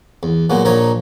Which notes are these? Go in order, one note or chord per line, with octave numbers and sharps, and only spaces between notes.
E2
A#2 F#3 G#3 B3
A#1 A#2 F3 D#4 C#5 A#5